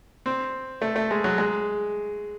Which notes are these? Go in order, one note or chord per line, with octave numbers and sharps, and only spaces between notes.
C4
A3
A3
G#3
F#3
G#3